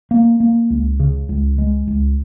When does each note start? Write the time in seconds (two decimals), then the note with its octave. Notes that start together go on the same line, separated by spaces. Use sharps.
0.11 A#3
0.40 A#3
0.70 C#2
1.00 C#3
1.29 C#2
1.58 G#3
1.87 C#2